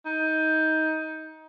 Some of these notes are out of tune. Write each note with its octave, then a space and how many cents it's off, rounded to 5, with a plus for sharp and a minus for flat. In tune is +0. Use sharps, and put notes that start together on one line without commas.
D#4 +20